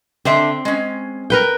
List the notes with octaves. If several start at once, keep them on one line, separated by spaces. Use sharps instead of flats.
D3 C4 D4 C5 E5
G#3 C#4
A#4 B4 G5